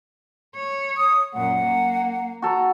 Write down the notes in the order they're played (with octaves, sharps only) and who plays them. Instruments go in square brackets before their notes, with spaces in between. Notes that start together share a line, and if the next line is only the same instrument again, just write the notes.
[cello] C#5
[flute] D#6
[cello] F#2 A#2 [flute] F#5
[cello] A#3
[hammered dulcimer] F#4 A4 A#5